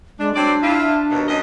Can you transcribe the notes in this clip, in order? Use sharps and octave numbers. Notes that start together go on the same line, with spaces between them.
G#3 D4
F#3 C4 D4 D5
E4 F4
D#2 B2
F#2 D#5